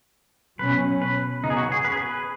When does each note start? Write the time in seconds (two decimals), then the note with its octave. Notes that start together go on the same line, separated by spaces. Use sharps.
0.59 B2 F#3 C#4 B4
1.02 B4
1.43 C#3 B3 D#4
1.50 G#4
1.57 F#4
1.72 G#4
1.85 B4
1.92 G#4
2.00 B4